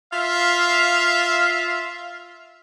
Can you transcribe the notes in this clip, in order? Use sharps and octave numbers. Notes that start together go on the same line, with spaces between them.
F4 E5 F5